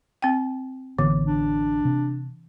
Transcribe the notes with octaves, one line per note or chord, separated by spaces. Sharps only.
C4 G5
A1 D3 E3 B3
D4
C3